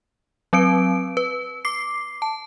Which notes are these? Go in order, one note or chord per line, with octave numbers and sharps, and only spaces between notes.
F#3 C4 B4 D7
B4
D6 C7
A5